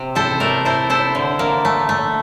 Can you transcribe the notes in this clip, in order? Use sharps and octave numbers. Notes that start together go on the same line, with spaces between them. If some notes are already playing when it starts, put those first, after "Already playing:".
Already playing: C3
E4 A4 C5
A3 A#4 D5
E4 A4 C5
E4 A4 C5
D3
A#3
A3
A3